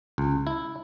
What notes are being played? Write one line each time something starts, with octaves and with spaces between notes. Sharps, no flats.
C#2
E4